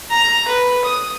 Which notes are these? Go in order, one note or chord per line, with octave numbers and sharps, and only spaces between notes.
A#5
B4
D#6